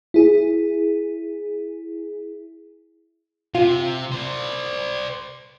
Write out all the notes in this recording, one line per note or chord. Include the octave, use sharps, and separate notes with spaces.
E4 G#4
C3 F4
C5 D5